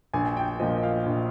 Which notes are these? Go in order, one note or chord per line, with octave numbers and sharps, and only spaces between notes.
A#1 G#5
G#5
G5
A#2 F3 D#5
D#5
F5
A#1